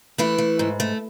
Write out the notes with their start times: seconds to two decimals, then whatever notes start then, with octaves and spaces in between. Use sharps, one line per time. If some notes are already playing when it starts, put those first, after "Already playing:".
0.18 E3 A3 E4
0.38 A3
0.59 G#2
0.80 A3